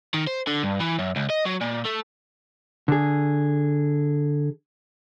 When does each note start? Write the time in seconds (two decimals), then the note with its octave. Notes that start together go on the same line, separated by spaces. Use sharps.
0.14 D#3
0.27 C5
0.47 D3
0.63 G2
0.80 E3
0.99 F#2
1.16 C#2
1.30 D#5
1.46 F#3
1.61 A#2
1.85 A3
2.88 D3 G#4